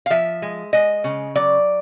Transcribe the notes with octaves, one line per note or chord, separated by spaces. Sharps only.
F5
F3 E5
G#3
G#3 D#5
C#3
F#3 D5